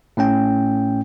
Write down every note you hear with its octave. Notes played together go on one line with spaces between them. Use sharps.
A2 A3 C#4 G5